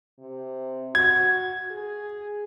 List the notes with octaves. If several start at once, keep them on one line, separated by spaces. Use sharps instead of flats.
C3
F#4 G#6
G#4